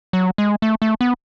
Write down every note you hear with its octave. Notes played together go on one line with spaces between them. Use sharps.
F#3
G#3
A3
A3
B3